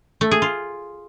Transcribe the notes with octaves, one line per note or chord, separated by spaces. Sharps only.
A3
G#4
F4